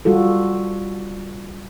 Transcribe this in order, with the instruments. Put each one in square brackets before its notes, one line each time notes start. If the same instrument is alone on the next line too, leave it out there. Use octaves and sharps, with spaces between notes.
[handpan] G3 F4 F#4 A4